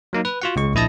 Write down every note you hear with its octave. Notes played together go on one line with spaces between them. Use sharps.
F#3 A#3 D#4
B4
F4 F#4 F#5
C#2 G#3 C#6
A#1 E4 D#5 A5 A#6